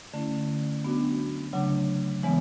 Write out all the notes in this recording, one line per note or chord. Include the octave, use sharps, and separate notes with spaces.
D3 A3 C#4 E4
F#3 B3 D4 F#4
C#3 F#3 A3 D4
C#3 E3 G#3 B3